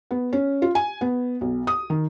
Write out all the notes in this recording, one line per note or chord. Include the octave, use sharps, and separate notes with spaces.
B3
C#4
F4
G#5
B3
B1
D#6
D#3